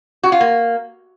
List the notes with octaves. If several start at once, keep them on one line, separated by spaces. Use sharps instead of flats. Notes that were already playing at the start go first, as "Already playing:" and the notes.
F#4
F4
A#3